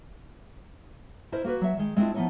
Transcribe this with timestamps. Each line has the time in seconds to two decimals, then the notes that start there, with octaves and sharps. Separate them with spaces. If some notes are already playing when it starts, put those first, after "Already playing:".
1.32 E4 A#4 C5 D#5
1.44 A#3 F#4 A#4 B4
1.61 F#3 E5
1.77 D#3 G#3
1.96 G#3 C4 D4 E4 F4
2.14 F3 B3 C#4 D#4 E4 C#5